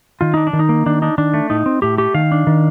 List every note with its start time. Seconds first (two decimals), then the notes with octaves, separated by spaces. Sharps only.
0.21 D#3 F4
0.34 D4 D#4
0.47 D4
0.53 D#3
0.59 D#4
0.69 A#3
0.86 D#3 D4
1.02 D4 D#4
1.18 D#3 D4
1.34 A3
1.50 A2 D#4
1.66 C4
1.82 A2 G4
1.98 A3 G4
2.14 D#3 F5
2.32 D4
2.47 D#3